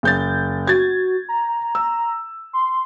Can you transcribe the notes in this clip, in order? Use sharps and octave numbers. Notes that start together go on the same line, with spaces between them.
F#1 G6 A6
F#4 G#6 A6
A#5
E6
C6